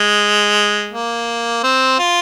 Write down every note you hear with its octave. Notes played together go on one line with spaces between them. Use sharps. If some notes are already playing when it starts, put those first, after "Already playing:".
Already playing: G#3
A#3
C4
F4